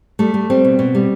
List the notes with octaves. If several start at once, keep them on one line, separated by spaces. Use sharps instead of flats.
G3 A3
G3
G3 C4
B2
B2
G3